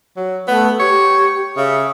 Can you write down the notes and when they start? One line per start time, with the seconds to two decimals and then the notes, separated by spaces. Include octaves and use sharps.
0.16 F#3
0.47 A3 B3
0.79 G4 C#5
1.57 C#3 E5